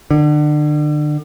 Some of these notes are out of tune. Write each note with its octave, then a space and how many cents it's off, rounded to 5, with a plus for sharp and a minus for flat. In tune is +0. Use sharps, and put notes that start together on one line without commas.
D3 +30